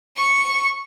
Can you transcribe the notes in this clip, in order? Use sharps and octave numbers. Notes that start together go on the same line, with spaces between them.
C#6 C#7